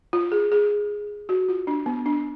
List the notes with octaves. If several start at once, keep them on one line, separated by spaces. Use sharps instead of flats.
F4
G#4
G#4
F#4
F4
D4
B3
D4